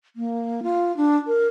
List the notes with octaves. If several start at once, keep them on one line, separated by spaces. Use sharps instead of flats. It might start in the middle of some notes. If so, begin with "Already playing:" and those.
A#3
F4
D4
A#4